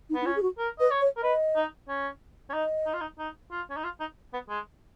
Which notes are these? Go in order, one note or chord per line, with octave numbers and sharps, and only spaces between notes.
D#4
B3
D#4
C#4 F4
G#4
F#4
A#4
B4 D#5
C#5
C#5
A#4
B4 D#5
D#4
C#4
C#4
D#4 D#5
D#4
F4
D#4
D#4
F4
C#4
D#4
F4
D#4
B3
G#3